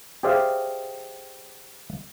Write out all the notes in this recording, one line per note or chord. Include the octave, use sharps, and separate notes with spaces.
G4 G#4 C5 D5 E5 F5